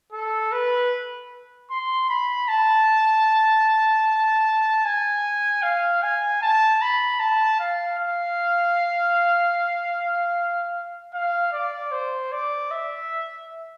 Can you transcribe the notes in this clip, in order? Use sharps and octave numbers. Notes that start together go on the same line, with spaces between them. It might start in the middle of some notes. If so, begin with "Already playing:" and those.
A4
B4
C6
B5
A5
G#5
F5
G#5
A5
B5
A5
F5
F5
F5
D5
C5
D5
E5